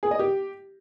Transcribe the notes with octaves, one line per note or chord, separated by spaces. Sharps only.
G#4
D#5
G4